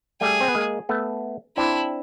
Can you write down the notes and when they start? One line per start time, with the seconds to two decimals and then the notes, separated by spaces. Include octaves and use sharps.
0.21 G3 A3 G#4
0.41 C4
0.48 B3
0.55 G#3 A#3
0.89 A3 B3
1.57 C4 D4 E4